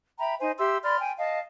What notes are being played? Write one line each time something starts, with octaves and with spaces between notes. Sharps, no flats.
E5 G5 A#5 B5
D#4 C5 G#5
G4 E5 C6 E6
D5 B5 C6 F6
G5 G#5
D#5 F5 A5